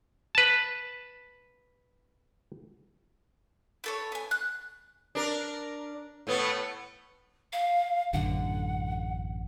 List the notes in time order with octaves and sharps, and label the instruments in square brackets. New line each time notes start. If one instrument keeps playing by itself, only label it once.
[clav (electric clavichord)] B4 A5
[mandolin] E4 A4 C#5
B3 G#5
F#6
[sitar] D4 A#4
A2 A3 B3
[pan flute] F5
[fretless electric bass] A1 F#2 D3 [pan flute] F#5